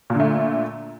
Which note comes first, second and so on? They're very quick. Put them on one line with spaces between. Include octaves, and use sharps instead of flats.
A#2 D3 A3